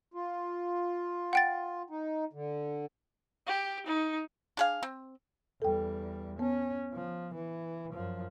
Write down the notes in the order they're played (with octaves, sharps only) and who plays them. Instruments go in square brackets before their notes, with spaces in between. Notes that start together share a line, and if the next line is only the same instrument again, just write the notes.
[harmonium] F4
[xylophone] F#5 G5 A6
[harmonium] D#4
D3
[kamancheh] G4
D#4
[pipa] D4 G#4 F5
C4
[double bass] E2 G3 [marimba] A4 G5
[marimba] B3 [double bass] C#4
[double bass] F3
E3
F#2 F3